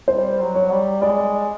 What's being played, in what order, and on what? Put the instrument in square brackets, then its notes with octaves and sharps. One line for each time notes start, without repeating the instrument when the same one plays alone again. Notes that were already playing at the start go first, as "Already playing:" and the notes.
[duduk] G3 [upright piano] C5
[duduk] F#3
[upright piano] C#5
[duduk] G3
[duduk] G#3 [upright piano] D5